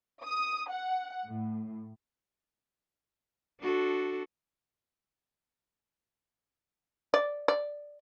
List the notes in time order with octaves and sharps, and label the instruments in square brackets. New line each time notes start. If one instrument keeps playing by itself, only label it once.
[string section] D#6
F#5
A2
[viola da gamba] D4 F#4 A4
[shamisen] D5
D5